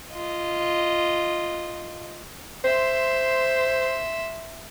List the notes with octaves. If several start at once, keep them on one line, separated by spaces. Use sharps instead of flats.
F4 D#5
C5 E5 C6